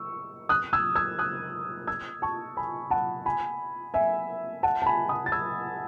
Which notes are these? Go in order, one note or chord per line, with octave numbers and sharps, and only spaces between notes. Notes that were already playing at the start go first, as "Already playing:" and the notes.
Already playing: C#6 E6
D#6 F#6
E6 G#6
E6 G#6
D#6 F#6
E6 G#6
A5 C#6
G#5 B5
F#5 A5
G#5 B5
E5 G#5
F#5 A5
A5
G#5 B5
B5 D#6
A6
E6 G#6